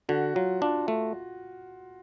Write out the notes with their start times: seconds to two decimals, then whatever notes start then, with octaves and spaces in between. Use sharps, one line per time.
0.09 D3 F#4
0.35 F#3 F4
0.62 D4 F4
0.88 A3